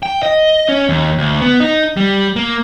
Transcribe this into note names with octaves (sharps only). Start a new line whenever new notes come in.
G5
D#5
C#4
D#2
D2
B3
D#4
G3
A#3